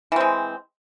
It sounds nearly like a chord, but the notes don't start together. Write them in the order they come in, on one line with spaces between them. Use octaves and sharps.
E3 C4 G#3